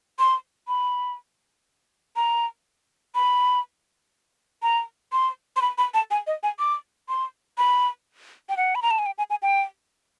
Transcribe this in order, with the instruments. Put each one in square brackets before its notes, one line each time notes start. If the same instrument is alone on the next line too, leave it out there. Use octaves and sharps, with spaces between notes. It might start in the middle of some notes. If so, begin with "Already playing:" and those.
[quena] C6
B5
A#5
B5
A#5
C6
C6
B5
B5
A5
G#5
D#5
G#5
D6
C6
B5
G5
F#5
B5
A#5
A5
G#5
G5
G#5
G#5
G5